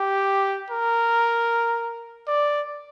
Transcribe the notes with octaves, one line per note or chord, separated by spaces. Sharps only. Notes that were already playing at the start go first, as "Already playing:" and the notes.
Already playing: G4
A#4
D5